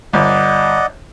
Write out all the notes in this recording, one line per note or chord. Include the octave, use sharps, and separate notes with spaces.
G1 D5 D#5 F#5